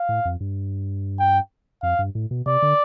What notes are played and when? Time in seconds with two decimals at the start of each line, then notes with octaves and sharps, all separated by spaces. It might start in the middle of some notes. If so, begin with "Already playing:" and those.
Already playing: F5
0.09 A2
0.25 F2
0.40 G2
1.19 G5
1.82 F2 F5
1.99 G2
2.15 A2
2.31 B2
2.46 C3 D5
2.62 D3